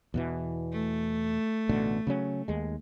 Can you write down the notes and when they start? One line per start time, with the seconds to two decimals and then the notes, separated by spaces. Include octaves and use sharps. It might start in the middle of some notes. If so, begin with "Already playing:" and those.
0.14 E2 B2 E3
0.72 A3
1.69 A1 B2 D3
2.07 C#3 F#3 C#4
2.48 D#2 G#3